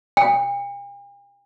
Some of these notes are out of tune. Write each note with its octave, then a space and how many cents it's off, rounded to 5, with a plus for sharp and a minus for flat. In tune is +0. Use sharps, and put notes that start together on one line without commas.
G5 +45